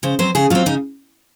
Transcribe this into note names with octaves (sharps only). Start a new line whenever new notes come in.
C#3 C5
F#3 C4 C5
C#3 G#4
F#3 C4 F4
C#3 D#4